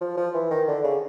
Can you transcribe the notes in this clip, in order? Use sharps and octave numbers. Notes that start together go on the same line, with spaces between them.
F3
F3
E3
D#3
D3
C#3